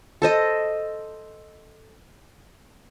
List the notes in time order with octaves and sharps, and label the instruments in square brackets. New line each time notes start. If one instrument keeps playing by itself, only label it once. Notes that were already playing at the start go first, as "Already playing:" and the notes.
[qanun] A4 C5 D#5